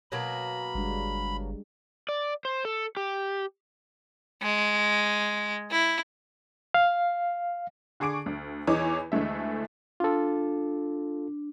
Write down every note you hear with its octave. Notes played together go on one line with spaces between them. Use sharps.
B2 F#3 A#3 B5
G1 G3 G#3 D4
D5
C5
A4
G4
G#3
E4
F5
D3 G#4 C#6 D6 D7
D2
E2 E3 D#4 G#4 C#5 D6
D2 E3 G#3 A3 E5
D4 F4 A4